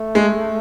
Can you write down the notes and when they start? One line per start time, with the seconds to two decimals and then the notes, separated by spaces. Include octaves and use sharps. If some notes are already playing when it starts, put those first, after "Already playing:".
Already playing: A3
0.15 G#3